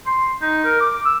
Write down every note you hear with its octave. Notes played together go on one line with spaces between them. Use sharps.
C6
D#4
A#4
D6
E6